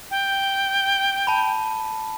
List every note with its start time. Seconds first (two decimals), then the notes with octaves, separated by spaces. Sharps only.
0.11 G5
1.27 A5 B5